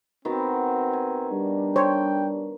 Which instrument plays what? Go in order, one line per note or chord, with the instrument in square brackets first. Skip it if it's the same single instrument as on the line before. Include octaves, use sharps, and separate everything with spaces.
[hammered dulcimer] D#3 B3 F#4 [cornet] C4
[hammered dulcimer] G#5
[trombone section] G3 D4
[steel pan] C5 C#5 [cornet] G5